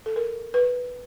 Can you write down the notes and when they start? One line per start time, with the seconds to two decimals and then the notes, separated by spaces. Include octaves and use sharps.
0.06 A4
0.16 A#4
0.54 B4